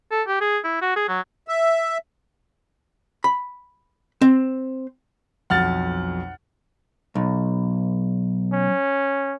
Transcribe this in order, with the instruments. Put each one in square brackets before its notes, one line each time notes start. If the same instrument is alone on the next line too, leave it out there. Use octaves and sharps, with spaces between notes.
[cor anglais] A4
G4
G#4
E4
F#4
G#4
F#3
[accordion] E5
[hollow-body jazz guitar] B5
C4
[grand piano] B1 F2 B2 [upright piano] F#5 F6 A6
[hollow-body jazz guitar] B1
[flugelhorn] C#4